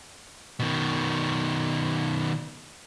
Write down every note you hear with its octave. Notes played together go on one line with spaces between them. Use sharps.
B2 D#3